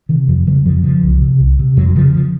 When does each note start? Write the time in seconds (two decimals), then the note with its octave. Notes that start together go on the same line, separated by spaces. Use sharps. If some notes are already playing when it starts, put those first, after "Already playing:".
0.09 C3 D#3
0.28 F2 F3
0.47 C#3 F#3
0.65 F2 F3
0.84 C#3 F3
1.03 C2
1.22 C3
1.40 C2
1.59 C3
1.77 F2 F#3
1.95 C#3 F3
2.15 F3